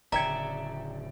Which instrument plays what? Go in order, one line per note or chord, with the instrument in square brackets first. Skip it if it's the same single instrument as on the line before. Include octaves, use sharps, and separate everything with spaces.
[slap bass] D1 C#3 [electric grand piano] D5 G5 C#7 [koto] E5 [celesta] A#5 G#6